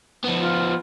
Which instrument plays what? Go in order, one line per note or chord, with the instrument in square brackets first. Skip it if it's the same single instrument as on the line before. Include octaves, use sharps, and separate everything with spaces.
[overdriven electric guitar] F3 B3
[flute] F4